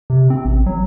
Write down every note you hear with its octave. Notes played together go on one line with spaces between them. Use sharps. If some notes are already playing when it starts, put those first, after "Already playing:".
C3
C4
A1
F#3